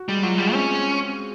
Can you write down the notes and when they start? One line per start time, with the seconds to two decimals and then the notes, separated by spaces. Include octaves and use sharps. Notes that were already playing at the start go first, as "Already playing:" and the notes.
Already playing: F#4
0.09 G3 G#3
0.23 F#3 F4
0.38 G3 G#4
0.53 C4 C#4